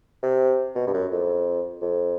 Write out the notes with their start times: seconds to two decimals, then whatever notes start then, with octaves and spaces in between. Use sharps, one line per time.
0.23 C3
0.75 B2
0.87 G2
0.94 F#2
1.11 F2
1.82 F2